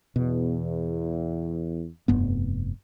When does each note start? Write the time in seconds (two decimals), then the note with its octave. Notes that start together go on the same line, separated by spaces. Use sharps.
0.16 E2 B2
2.08 F1 G2 B3